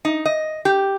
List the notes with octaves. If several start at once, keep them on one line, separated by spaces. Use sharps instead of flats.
D#4
D#5
G4